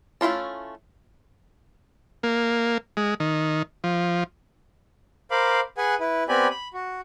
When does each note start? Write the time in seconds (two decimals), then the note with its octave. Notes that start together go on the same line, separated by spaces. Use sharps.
0.21 A3 C#4 E4 F4 A5
2.23 A#3
2.97 G#3
3.20 D#3
3.84 F3
5.31 A#4 C5 F5 B5 D6
5.78 G#4 B4 F#5 G#5
6.00 E4 B4
6.29 B3 C4 G4 D5 G#5 B5
6.51 B5
6.74 F#4